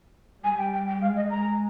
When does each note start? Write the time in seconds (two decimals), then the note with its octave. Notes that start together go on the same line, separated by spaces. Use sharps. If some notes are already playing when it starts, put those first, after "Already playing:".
0.43 G3 G#5
0.58 G5
0.73 G5
0.87 G5
1.01 G#3 F5
1.16 D#5
1.30 G#3 A#5